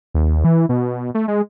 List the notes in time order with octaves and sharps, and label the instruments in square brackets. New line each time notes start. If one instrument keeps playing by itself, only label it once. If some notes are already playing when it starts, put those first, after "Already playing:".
[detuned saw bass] D#2
E3
B2
A3
G#3